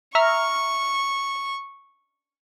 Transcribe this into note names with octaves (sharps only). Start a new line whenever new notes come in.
E5 A#5 C#6 F6